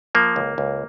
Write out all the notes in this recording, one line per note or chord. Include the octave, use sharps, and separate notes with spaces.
F3 A#3
C#2
C#2